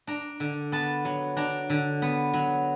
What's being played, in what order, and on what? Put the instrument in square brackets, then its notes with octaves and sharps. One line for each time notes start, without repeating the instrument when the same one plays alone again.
[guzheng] D4 A#5
D3
B3 A5
F#3
D4 A#5
D3
B3
F#3